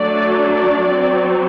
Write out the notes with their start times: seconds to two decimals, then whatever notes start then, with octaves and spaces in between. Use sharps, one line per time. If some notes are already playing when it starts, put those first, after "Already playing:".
Already playing: F#3 A3 D4 D5
0.37 D5
0.87 F#3 C4